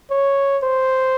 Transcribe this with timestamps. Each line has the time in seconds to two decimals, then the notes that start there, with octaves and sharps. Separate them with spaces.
0.11 C#5
0.63 C5